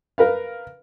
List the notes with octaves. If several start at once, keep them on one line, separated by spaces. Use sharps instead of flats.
A#4 B4 F5